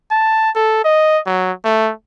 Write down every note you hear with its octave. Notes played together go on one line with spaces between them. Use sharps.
A5
A4
D#5
F#3
A3